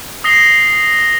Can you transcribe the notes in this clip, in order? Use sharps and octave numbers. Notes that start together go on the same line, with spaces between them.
D#6 A#6 C7 G7